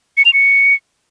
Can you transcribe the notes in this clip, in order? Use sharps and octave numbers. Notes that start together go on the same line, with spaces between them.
C#7
F7
C#7